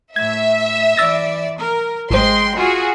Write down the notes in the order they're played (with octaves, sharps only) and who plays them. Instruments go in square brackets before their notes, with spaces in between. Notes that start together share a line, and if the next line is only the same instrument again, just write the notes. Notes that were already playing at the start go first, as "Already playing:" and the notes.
[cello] A2 [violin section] E5 [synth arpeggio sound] G#6
[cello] E3 D5 [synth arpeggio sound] E6 A6 A#6
[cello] A#4
[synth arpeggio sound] G#1 C5 [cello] G#3 G5 [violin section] C6
[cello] F4 [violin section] F#4 G#4